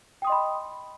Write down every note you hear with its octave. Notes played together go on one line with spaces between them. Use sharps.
D#5 G5 B5 C6 D#6